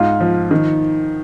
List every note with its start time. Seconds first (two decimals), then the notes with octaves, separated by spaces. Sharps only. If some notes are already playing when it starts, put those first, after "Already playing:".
Already playing: G#2 F4
0.21 F3
0.51 D#3